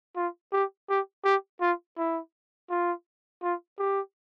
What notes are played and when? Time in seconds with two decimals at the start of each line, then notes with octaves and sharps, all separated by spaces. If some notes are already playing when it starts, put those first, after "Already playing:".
0.16 F4
0.53 G4
0.89 G4
1.24 G4
1.61 F4
1.97 E4
2.70 F4
3.43 F4
3.79 G4